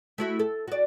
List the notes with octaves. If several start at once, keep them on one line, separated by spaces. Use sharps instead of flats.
A3 E4 F#4
A4
F#4 D5